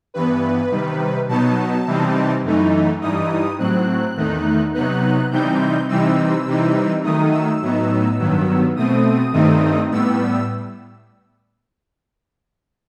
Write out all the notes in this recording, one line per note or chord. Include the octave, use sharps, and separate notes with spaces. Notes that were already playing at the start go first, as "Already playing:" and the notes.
G2 E3 B3 B4
C3 D#3 G3
B2 F#3 B3 D#4 A5
C3 E3 G3 C4 D#4
F#2 E3 A3 D#4
G2 E3 G3 D#4 D#6
A2 F#3 C4 F#6
E2 D#3 A3 D#4
C3 F#3 B3 D#4 F#6
C3 E3 G3 C4 D#4 G6
C3 E3 G3 C4 D#4 E6
C3 E3 G3 C4 D#4
D#3 F#3 A3 D#4 D#6
E6
A2 F#3 B3 D#4
G2 D#3 F#3 B3
B2 A3 C4 D#6
G2 D#3 A3 C4 D#4
A2 G3 B3 E6